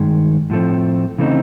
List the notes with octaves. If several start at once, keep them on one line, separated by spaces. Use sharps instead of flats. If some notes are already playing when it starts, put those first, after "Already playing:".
Already playing: G2 D#3 G#3
A2 F3 A3 C4
C#3 E3 A3 C4 D#4